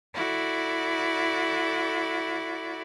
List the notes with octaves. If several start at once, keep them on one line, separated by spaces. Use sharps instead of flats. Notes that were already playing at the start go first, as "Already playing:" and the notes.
E4 F#4 A4 D5